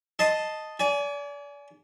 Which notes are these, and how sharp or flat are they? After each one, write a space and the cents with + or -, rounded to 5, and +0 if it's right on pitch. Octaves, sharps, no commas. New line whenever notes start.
D#5 +0 A5 +0 C6 +0
D5 -35 G#5 +20